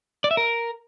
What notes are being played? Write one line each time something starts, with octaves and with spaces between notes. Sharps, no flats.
D5
E5
A#4